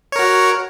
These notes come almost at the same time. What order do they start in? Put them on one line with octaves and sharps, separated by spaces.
C#5 A#4 F#4